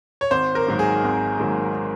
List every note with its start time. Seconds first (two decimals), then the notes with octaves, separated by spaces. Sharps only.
0.21 C#5
0.31 G#1 C5
0.55 A#4
0.67 G#2 D#3 F#3 A#3
0.79 G#4
1.04 G#1
1.40 G#2 D#3 F#3 A#3